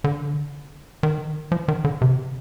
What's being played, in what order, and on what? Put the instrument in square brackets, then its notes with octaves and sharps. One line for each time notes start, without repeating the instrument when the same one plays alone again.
[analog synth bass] D3
D#3
F3
D#3
D3
C3